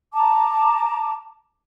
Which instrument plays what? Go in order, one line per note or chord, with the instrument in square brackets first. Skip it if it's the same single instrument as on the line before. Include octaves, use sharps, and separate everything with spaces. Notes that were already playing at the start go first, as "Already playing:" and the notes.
[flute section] A5 A#5 D6